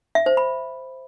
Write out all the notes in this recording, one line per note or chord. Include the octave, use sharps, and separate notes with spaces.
E5
C5
B5